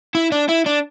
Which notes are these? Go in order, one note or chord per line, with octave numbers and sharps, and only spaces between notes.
E4
D4
E4
D4